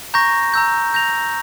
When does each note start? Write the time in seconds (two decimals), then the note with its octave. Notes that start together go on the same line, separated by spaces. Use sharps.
0.14 A#5 C#6 G6 A#6
0.54 A#5 E6 G6
0.94 G6 A#6 F7